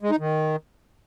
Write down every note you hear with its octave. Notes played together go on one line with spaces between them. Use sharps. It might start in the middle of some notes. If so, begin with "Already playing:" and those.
G#3
D#4
D#3